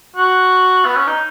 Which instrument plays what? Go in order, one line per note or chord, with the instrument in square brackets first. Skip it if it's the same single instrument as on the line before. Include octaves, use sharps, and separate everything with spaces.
[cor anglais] F#4
B3
C#4
D#4